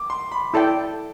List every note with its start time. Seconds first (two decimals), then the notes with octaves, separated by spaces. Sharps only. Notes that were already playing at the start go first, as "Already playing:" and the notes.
Already playing: D6
0.10 C6
0.32 B5
0.54 E4 A4 D5 G5 A5